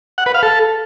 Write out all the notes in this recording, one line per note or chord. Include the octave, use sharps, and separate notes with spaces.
F#5
B4
F5
A4